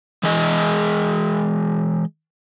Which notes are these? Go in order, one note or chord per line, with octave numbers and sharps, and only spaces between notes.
E3 G#3 G#4 D#5